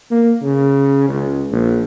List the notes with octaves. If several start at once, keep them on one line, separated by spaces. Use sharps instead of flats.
A#3
C#3
C#2
A#1